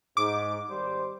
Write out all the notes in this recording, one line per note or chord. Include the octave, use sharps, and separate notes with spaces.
G#2 D6
G#1 G3 C5